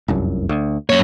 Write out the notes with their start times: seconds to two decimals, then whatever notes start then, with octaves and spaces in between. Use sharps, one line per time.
0.08 F1 C2 F#2
0.49 D2
0.90 F#2 A#3 C#5